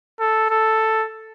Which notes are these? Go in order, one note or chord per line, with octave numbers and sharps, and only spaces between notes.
A4
A4